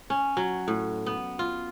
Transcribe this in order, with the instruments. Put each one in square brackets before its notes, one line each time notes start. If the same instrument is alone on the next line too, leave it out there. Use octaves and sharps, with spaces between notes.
[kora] C#4
F#3
A2
B3
F4